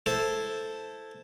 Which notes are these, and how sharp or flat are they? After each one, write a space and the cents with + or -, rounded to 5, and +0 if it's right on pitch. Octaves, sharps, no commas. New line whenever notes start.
E4 +0 A4 +0 C5 +0